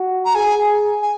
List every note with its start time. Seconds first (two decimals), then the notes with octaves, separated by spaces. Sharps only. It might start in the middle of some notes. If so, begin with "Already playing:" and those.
Already playing: F#4
0.25 A#5
0.35 G#4 G#5
1.02 G#5